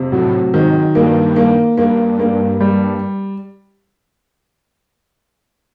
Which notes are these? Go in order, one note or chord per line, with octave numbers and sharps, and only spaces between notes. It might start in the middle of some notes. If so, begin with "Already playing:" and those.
Already playing: F2 C3
A2 F#3
G#2 D#3
G2 A#3
A#3
G2 A#3
A#3
G3